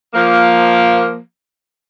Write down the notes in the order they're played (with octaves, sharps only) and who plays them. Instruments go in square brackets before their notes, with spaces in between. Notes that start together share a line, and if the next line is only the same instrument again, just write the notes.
[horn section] F3 A#3